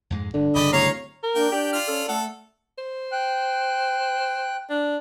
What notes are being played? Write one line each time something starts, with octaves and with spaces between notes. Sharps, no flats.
F2 G#2 G#3
G1 D3
G1 C#3 D5 D#5 B5
D1 C#5 F5 A#5
A#4
A#3 D4 G5
D4 G4 D5
F4 F6
C#4 A4
A3 A4 F#5
C5
G5 F#6
D4